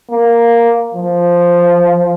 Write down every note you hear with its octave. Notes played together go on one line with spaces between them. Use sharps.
A#3
F3